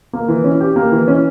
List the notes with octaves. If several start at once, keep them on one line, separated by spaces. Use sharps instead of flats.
A#3
E3
C#4
G4
A#3
E3
C#4